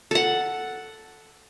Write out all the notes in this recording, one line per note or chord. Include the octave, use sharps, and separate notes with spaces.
A4 F#5